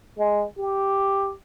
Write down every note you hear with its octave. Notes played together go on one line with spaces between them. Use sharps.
G#3
G4